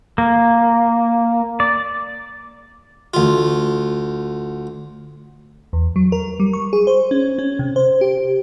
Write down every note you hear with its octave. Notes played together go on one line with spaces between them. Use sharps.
A#3
D5
D2 F4
E2
F#3
A#4
G3
C#6
G#4
C5
C#4
C#4
C3
C5
G4